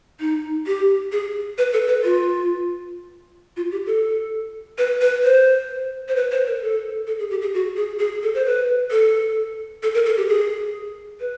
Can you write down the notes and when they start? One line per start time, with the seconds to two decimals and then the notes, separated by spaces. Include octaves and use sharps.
0.20 D#4
0.66 G4
1.12 G#4
1.58 B4
1.73 A4
1.88 B4
2.04 F4
3.57 F4
3.72 G4
3.86 A4
4.78 B4
5.01 B4
5.24 C5
6.08 C5
6.16 B4
6.31 C5
6.47 A#4
6.62 A4
7.07 A4
7.19 G#4
7.30 G4
7.42 G#4
7.54 F#4
7.76 G#4
7.99 G#4
8.23 A4
8.35 C5
8.45 B4
8.91 A4
9.83 A4
9.94 A#4
10.06 A4
10.17 G4
10.29 G#4
11.20 B4